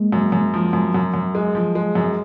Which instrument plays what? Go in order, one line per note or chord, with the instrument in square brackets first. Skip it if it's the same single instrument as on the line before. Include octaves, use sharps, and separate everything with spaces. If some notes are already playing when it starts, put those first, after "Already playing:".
Already playing: [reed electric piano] G#3 A#3
[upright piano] F#2 [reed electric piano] F#3
[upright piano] F#2
F3
F#2
[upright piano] F#2 [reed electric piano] F#3
[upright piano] F#2
G#3
F3
G#3
F#2